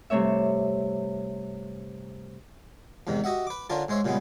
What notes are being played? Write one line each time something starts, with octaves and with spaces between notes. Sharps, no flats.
G2 C3 A3 C#5 E5
E2 G#2 C3 D#3
F#4 G4 D#5 E5 F#5
B4 D6
D3 C#4 D4 F4 A#4
G#2 G#3 C5 C#5 E5
A#2 C#3 G3 G#3 B3